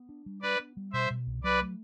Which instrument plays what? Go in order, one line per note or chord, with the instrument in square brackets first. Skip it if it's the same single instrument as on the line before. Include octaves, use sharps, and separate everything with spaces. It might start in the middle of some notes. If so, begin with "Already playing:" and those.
Already playing: [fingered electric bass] B3
D4
G3
[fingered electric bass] D4 [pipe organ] B4 D5
[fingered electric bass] B3
G3
[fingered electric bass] B2 [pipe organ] C5 E5
[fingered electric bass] B2
C2
[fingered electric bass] F#3 [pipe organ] B4 D5
[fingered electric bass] A3